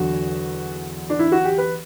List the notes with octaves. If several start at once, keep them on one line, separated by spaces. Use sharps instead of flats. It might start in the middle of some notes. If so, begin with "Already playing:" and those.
Already playing: E2 D3 F#3 F#4
D4
E4
F#4
G4
B4